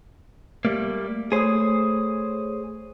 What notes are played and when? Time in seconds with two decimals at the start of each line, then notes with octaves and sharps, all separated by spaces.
0.65 G3 A3 A#3
1.32 A3 G#4 C5 C#5 D#6